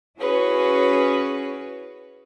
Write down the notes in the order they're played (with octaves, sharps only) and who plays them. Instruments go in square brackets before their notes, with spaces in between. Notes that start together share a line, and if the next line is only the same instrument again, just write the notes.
[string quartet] C#4 E4 F#4 G#4 B4 C#5